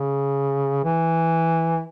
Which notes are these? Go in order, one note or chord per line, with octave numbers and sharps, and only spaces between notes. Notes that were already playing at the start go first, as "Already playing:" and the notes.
Already playing: C#3
E3